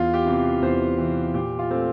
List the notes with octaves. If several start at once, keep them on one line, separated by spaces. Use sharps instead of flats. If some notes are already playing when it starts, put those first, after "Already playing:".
Already playing: E2 F4
G4
C3 E3
E2 C5
C3 E3
A#2 G4
F4
A3 C4